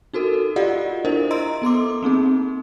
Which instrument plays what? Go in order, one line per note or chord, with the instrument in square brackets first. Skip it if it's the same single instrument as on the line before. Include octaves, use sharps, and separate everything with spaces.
[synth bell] D#4 F#4 A4 A#4
F4 G4 D5 D#5 F5 F#5
D4 E4 A#4 C5 D#5
D#5 E5 A#5 C6 E6 D7
B3 A4 C6 D6
A#3 C4 D#4 G#4